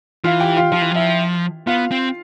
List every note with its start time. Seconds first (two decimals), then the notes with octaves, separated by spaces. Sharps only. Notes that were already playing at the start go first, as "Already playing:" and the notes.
0.24 E3 F4 F5
0.40 G4 G5
0.57 F4 F5
0.72 F3 F4 F5
0.82 E3
0.92 F3 E4 E5
1.67 B3 F4 F5
1.91 C4